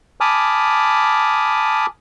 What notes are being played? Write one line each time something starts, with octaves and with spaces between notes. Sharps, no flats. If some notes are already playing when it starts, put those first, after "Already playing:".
G#5 A5 B5 D6 D#6 F6